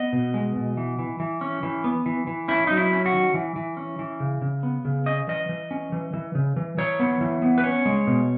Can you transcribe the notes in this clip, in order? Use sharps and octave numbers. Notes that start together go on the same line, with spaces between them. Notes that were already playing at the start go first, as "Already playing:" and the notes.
Already playing: B3 D#5
B2
G#3
B2
E3
E3
E3
C#4
E3
B3
E3
E3
C#4 E4
F#3 D#4
E4
C#4
F#4
D#3
E3
E3
C#4
E3
C#3
C#3
B3
C#3
C#4 D#5
E3 D#5
E3
C#4
E3
E3
C#3
E3
E3 C#5
B3
E3
B3
B4
C#4 C#5
G#3
B2